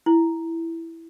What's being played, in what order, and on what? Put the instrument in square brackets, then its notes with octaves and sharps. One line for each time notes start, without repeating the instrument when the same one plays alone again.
[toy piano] E4